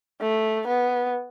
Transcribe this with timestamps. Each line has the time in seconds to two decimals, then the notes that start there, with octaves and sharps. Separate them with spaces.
0.21 A3
0.67 B3